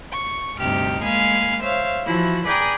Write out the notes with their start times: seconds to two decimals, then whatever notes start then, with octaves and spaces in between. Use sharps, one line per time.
0.12 C#6
0.58 D2 G2 C3 D#4 G4 F6
1.02 G#3 A#3 F5 G#5 B5
1.61 C5 C#5 E5 F5
2.06 E3 F3 E4 F#4
2.46 G#4 B4 D5 G5 G#5 A#5